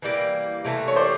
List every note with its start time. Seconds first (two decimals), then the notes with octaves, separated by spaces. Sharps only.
0.02 E3 G3 A#3
0.65 C3 E3 A3
0.88 C#5
0.96 C5 D5